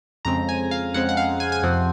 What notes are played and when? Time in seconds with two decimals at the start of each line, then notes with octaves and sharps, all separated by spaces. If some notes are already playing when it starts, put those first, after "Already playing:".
0.25 F2 C#3 G#3 C4 A#5
0.49 G#5
0.71 F5
0.94 F2 C#3 G#3 C4 F#5
1.09 F#5
1.17 F5
1.40 G#5
1.52 G#5
1.63 F2 C3 F3 C4 F#5